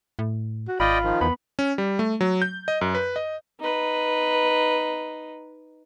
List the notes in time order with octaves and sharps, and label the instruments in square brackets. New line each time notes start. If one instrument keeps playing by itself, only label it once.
[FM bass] A2
[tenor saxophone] F#4
[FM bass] G#1 [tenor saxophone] F4 [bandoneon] D5 D#5 G5 [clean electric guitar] B5
[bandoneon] D#3 F3
[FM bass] E2 [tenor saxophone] B3 [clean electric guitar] B5
[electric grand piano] C#4
G3
A3
F#3
G6
D#5
F#2
B4
D#5
[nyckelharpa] D#4 B4